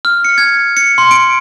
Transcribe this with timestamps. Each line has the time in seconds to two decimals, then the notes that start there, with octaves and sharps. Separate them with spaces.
0.05 F6
0.25 C#7
0.38 G#6
0.77 C#7
0.98 C6
1.11 D7